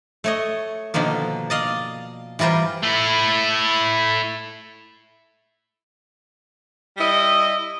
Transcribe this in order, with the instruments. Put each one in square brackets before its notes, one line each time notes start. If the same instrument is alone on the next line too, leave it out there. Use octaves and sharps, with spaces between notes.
[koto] A3 C#5 D#5
B2 D3 D#3 F3 A#3
D5 D#5 F5
E3 G3 F4 A#4 C5
[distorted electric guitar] A3 E4
[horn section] G3 E4 D#5